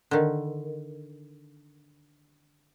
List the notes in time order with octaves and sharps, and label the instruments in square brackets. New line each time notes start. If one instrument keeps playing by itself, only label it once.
[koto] D3 D#3